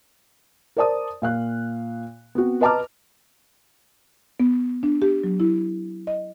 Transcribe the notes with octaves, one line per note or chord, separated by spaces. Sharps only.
A#4 C5 D5 A5 D#6
A#2 F5 F#6
B3 C4 F#4
B4 D#5 A5 A#5 D6 F6
B3
D4
G4
F#3
E4
D#5